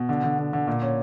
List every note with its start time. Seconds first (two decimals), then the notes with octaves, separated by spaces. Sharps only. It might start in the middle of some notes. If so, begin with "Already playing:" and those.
Already playing: B2
0.09 D3
0.24 D3
0.38 D3
0.53 D3
0.68 A#2
0.82 C#4